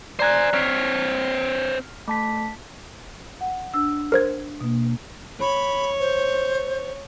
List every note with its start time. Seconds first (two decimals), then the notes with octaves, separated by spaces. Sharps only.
0.19 C5 D5 G#5 A#5 F#6
0.54 C4 C#5 F6 B6 C7
2.08 A3 A5 B6
3.41 F#5
3.74 D4 E6
4.12 A#4 C5 G#6
4.61 B2 A#3
5.41 C#5 B5
6.00 C5